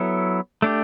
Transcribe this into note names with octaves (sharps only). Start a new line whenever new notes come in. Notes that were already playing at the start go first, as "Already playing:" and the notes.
Already playing: F#3 B3 E4 A4 C#5
A3 D4 G4